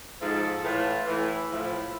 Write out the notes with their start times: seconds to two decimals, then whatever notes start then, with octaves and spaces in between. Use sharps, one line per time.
0.21 G#2 F3 A4
0.63 A2 E3 F4
1.06 A2 E3 E4
1.49 A2 F3